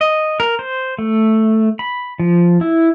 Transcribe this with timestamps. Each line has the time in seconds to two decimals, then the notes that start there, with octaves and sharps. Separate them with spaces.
0.01 D#5
0.40 A#4
0.59 C5
0.99 A3
1.79 B5
2.20 F3
2.61 E4